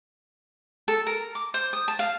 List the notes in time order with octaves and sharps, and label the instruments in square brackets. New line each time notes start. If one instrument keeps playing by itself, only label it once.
[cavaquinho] A4
A#4
D6
C5
D#6
A5
F5